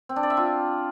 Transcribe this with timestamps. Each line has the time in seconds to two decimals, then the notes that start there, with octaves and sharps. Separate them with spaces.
0.09 C4
0.16 D4
0.23 D5
0.30 E5
0.37 F4